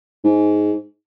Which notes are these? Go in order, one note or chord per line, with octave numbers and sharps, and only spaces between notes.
G#2